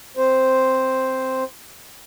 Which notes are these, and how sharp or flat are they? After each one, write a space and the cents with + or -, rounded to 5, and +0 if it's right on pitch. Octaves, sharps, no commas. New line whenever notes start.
C4 +0 C5 +0